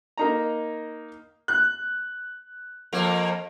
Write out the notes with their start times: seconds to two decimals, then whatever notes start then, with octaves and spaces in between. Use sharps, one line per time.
0.18 A#3 D#4 A#5
1.48 F#6
2.93 F2 A#3